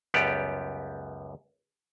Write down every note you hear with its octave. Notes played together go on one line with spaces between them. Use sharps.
C#2 F#2 G3 B3 G4 D5